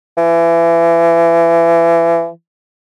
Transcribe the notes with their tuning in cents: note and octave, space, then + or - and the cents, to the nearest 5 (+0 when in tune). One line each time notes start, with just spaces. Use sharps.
E3 +30